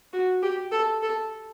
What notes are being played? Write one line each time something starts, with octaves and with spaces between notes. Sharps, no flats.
F#4
G4
A4
A4